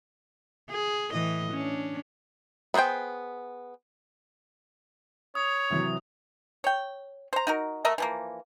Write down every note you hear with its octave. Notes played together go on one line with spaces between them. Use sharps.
G#4
A2 E3 D#5
C#4 D4
B3 G#4 A#4 C5 G5
C#5 D#6
C3 E3 F#3
C#5 G5
C5 A#5
D#4 F#4 A#4
A3 A#4 D#5 E5
E3 F3 A#3